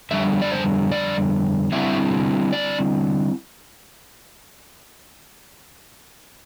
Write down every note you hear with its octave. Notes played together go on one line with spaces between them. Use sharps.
F2 D3 G3 E5
D5
C5
D5
D3 G3 C4 E4 E5
D5